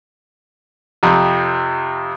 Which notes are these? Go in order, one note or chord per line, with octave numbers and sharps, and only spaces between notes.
F2 C3